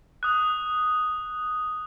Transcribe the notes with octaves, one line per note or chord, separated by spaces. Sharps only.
D#6 F#6